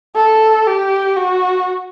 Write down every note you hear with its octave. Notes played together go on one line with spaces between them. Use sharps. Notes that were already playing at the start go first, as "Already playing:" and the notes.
A4
G4
F#4